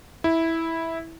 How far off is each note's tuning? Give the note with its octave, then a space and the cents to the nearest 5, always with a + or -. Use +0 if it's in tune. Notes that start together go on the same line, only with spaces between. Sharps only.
E4 -10